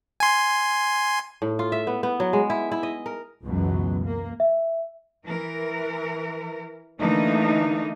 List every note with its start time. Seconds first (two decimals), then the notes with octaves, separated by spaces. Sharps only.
0.20 G#5 C6
1.42 A2
1.59 F4
1.72 E5
1.87 B3
2.03 B3
2.20 F#3
2.33 G#3
2.50 E4
2.72 E4
2.83 D#5
3.06 A#4
3.44 C#2 F#2 B2 E3 F#3
4.04 A#3
4.40 E5
5.26 E3 A#4
7.01 D3 E3 A3 A#3 D4 D#4